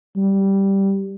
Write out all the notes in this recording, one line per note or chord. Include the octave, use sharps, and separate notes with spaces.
G3